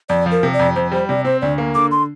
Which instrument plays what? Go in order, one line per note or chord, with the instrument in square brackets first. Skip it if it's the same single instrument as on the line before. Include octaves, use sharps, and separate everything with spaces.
[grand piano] F2 [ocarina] D5
[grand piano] F3
[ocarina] A#4
[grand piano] C3
[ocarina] D5
[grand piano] F2
[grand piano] F2 [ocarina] C5
[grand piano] G3 [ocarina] C5
[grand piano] C3 [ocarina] D5
[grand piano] C4 [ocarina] C5
[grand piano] D2 [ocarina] D5
[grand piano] A#3
[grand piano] D3 [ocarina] D6
[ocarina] C6